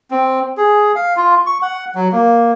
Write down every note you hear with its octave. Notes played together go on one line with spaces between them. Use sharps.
C4
G#4
F5
F4
C#6
F#5
F#3
A#3